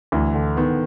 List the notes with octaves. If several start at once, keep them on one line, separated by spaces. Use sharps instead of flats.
D2 E3
D3
D#3 B3